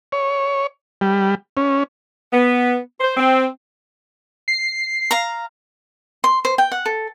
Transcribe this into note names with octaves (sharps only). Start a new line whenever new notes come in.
C#5
G3
C#4
B3
C5
C4
C7
F5 A#5
C6
C5
G5
F#5
A4